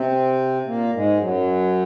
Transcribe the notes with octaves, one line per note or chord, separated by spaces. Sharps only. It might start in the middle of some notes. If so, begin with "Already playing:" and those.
Already playing: C3 C4
A#2 A#3
G#2 G#3
F#2 F#3